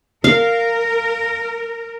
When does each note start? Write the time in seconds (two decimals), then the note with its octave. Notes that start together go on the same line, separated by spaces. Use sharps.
0.24 A#4 F5